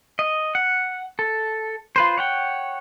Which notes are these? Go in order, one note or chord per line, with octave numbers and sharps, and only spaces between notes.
D#5
F#5
A4
F4 B4 C5
C#5 F#5 G5